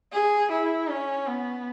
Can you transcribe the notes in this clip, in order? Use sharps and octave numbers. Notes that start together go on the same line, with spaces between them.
G#4
E4
C#4
B3